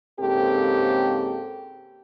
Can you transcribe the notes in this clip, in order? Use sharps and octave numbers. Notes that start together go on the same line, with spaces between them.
G#2 C#3 A#3 C4 G4 A4